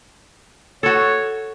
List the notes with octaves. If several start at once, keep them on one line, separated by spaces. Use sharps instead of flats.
F#4 A4 C#5